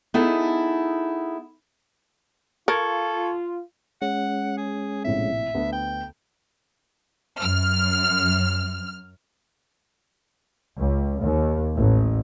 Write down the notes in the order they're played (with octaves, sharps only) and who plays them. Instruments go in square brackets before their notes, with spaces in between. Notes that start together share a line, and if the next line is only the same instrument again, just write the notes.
[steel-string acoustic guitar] B3 D#4 E4 G#4 A4
[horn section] F4 [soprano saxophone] A4 [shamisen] A#4 [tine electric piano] C#6 G#6
[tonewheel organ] G#3 C#4 [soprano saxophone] F#5
[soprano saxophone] G#4
[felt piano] A#1 A2 C3 [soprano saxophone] E5
[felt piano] D2 B3
[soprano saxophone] G5
[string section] F#2 F6
[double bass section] C#2
D#2
A1